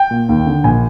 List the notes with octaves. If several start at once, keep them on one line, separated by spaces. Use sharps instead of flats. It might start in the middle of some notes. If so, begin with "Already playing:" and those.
Already playing: G5
A#2
D#2
D3
A#1 G#5